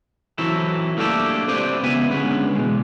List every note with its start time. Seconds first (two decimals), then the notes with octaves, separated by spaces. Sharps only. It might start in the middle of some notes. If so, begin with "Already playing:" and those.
0.38 E3 F#3 C4 E4 A4
0.97 A3 A#3 D4 D#4 G4 A4
1.48 C4 G4 B4 C5 D5
1.83 C#2 B3 E5 G#5
2.10 D3 G#3 B3 C#4
2.55 B2 G#3